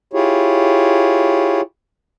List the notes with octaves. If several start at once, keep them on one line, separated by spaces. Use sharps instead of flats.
E4 F4 G4 G#4 C#5